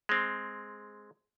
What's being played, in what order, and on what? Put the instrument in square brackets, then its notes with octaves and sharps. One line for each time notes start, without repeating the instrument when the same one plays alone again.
[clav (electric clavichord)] G#3 C4